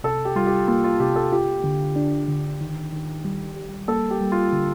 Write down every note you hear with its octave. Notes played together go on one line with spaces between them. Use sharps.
C3 A4
G4
G3 F4
G4
A#3 F4
F4
C3 G4
A4
F4 G4
D3
D4
D3
D#3
D#3
G3
G3
A#3 A4
G4
G3
F4
D3